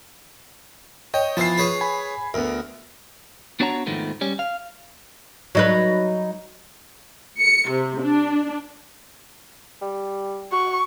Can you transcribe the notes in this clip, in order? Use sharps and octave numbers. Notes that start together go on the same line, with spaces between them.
C#5 D#5 G5
E3 F3 B3 A5 C7
G#4 B4 C#5
G#5 B5
D2 B3 A#4
B3 D4 F#4 C#5 F#5 A#5
F2 G#2 D#3 F3 A3 B3
G3 C#4
F5
F#3 D#4 B4
C#7
C3
D4
G3
F#4 C#6